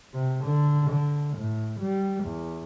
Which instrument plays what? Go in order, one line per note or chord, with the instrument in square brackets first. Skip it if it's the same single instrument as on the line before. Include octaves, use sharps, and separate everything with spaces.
[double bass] C3
D3
D3
A2
G3
E2